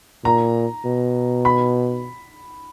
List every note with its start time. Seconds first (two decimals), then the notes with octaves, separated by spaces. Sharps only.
0.25 A#2 A#5
0.86 B2
1.45 B5